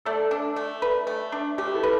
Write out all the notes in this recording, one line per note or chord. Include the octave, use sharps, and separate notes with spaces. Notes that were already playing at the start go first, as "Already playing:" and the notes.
A3 A4 D5
D4
A3
B4
A3
D4
A3 G4 B4
E4 A4
B4